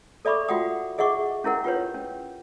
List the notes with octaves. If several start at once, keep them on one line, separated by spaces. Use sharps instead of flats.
A4 D5 E5 B5 C#6 D6
F4 F#4 E5 F#5 G5 D#6
G#4 D#5 E5 F#5 C#6 D6
C#4 E4 A#4 F#5
F4 G4 B4 C#5
C#4